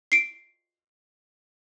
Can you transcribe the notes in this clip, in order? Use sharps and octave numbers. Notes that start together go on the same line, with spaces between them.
C7 D7